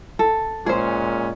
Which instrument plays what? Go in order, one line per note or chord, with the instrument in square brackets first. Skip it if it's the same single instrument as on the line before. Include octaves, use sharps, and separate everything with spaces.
[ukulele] A4
[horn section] A#2 G#3 C#4 [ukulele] G#4 C5